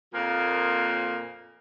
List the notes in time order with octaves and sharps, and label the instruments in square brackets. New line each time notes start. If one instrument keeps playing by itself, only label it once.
[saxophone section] F2 A#2 F3 A#3